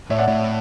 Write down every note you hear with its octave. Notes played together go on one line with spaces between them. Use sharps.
A2 C#5 E5
D5 F#5
A2 C#5 E5